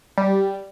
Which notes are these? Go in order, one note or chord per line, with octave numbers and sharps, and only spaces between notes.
G3